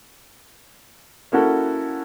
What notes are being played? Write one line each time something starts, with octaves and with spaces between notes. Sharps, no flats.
A#3 C#4 E4 F#4 A4